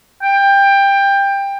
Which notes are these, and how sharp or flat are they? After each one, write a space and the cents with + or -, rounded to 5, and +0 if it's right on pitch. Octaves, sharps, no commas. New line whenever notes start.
G5 +20